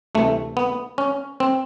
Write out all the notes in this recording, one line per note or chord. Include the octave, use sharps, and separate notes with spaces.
D2 C3 E3 A3
B3
C#4
C4